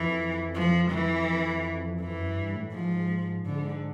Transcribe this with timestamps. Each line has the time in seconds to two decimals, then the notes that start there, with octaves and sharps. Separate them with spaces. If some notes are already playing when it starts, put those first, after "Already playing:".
Already playing: F2 E3
0.55 F3
0.92 E3
2.00 F2 E3
2.18 F#2
2.36 G2
2.55 A2
2.72 G#2 F3
3.45 G#2 D3